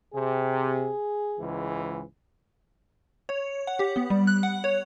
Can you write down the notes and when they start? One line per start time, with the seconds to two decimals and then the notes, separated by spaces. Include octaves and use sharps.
0.14 C3 G#4
1.39 C#2 G#2 E3
3.29 C#5
3.67 F#5
3.79 G4
3.96 B3
4.10 G3
4.27 F#6
4.43 F#5
4.64 C#5